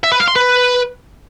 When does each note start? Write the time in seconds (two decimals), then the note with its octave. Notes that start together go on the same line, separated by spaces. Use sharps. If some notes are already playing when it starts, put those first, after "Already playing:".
0.04 E5
0.12 B4
0.20 F5
0.28 C6
0.36 B4